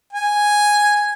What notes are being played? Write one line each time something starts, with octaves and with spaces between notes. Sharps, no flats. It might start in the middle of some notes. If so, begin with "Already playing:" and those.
G#5